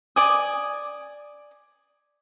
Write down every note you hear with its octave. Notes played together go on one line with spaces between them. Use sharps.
D5 G#5 D#6